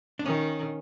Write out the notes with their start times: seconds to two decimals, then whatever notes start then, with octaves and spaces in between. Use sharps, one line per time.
0.19 D4
0.25 D#3 C#4